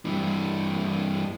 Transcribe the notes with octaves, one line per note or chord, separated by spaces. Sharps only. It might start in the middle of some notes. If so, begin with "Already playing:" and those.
G2 E3